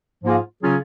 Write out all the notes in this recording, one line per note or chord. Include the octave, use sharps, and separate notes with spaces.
G#2 F3 A#3 F4 G#4
C#3 F#3 C#4 F4 G#4